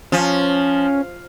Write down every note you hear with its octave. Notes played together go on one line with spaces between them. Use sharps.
F3 C#4